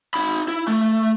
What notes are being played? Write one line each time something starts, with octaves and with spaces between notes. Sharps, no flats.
D#4 B5
E4
A3